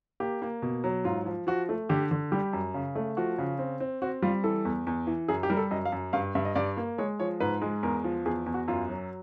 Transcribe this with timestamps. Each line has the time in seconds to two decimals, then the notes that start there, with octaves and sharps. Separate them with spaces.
0.20 A#3 G4
0.42 A#3
0.62 B2
0.84 F#3
1.04 G#2 F4
1.26 F3
1.47 F3 F#4
1.69 A3
1.89 D3 G4
2.11 D3
2.32 G3 G4
2.53 F#2
2.74 C#3
2.95 A3
3.17 F3 F#4
3.38 C#3
3.59 C4
3.80 C4
4.02 C4 F#4
4.22 G3 F4
4.44 E3 A4
4.65 E2
4.87 E2
5.07 E3
5.28 F#2 G#4
5.43 G4
5.50 G3 A#4
5.57 A4
5.71 F#2 D#5
5.85 F5
5.92 F#2
6.13 G2 F5
6.35 G2 E5
6.45 D#5
6.55 G2 D5
6.77 A#3
6.98 G#3 C#5
7.19 F3 C#5
7.40 G#2 B4
7.62 G#3
7.83 E2 A#4
8.04 F3
8.26 E2 G#4
8.46 E2
8.54 F#4
8.68 F#2 F4
8.89 F#3